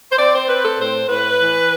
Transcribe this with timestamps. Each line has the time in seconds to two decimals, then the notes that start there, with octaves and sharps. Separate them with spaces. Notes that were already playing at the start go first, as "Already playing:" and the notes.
0.12 C5
0.19 C4 D5
0.34 C5
0.49 C4 B4
0.64 A4
0.79 A2 C5
1.09 A2 B4
1.40 E3